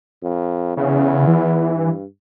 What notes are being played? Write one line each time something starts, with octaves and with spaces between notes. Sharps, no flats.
F2
E2 C#3
E3
G2